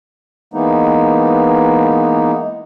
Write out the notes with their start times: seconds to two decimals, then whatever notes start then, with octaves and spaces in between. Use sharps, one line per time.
0.54 E3 G#3 A#3 B3 D#4